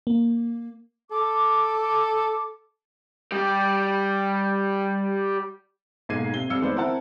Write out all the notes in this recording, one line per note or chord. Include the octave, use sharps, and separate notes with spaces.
A#3
A4 D6
G3 G4
B1 G#2 A#3 G#6 C7 D#7
C3 G7
F2 G3 F5 E6 C#7
D#3 G#3 B3 C5 D5
C4 E4 A#4 F#5 A5